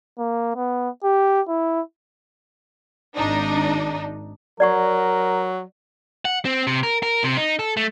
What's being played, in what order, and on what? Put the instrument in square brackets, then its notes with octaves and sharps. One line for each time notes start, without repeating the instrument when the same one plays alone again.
[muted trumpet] A#3
B3
G4
E4
[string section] G#1 D4 D#4
[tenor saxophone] F#3 [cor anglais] A#4 [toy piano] D5 F#5 C#6
[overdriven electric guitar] F#5
C4
C3
A#4
A#4
C3
D#4
A4
A3